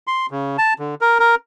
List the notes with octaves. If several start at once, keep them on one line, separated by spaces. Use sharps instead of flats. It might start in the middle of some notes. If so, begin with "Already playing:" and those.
C6
C#3
A5
D3
A#4
A#4